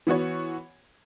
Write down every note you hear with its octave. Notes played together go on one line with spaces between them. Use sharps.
E3 B3 F#4 C#5